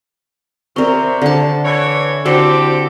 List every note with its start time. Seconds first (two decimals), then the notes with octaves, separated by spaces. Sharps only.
0.76 C3 C4 A#4 D5 C#6
1.22 D3 A5
1.65 E3 C#5
2.25 D3 C4 E4 F#4 G4 A4 C5